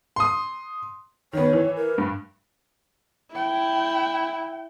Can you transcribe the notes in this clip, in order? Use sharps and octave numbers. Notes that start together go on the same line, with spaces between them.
C6 D#6
D#3 B3 C#5
E3
A#4
G2
E4 G5